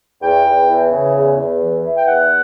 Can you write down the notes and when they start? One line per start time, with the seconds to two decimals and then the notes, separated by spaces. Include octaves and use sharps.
0.22 E2 G5
0.45 E2
0.68 E3
0.91 C#3
1.14 E2
1.37 E2
1.60 E3
1.83 E3
1.96 G5
2.06 E2 F#5